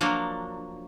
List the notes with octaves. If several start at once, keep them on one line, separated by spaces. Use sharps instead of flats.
F3 F#3 A#3 D4